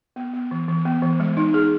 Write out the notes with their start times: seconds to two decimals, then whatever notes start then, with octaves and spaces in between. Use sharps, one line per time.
0.16 B3
0.34 B3
0.51 E3
0.68 E3
0.85 B3
1.02 E3
1.20 G#3
1.37 D#4
1.54 G#4